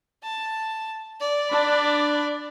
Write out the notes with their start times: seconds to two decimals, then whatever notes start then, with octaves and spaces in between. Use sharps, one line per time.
0.23 A5
1.20 D5
1.51 D4 B5